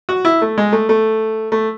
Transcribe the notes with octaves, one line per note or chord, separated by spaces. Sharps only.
F#4
E4
A3
G#3
A3
A3
A3